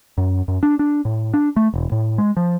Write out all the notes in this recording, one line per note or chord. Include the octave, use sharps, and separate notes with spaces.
F#2
F#2
D4
D4
A2
D4
A3
E1
A2
G#3
F3